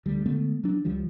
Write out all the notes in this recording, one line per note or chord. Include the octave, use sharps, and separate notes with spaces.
D2 G3
D3 G#3 A3 B3
F#3 D4
C#2 E3 F3 G3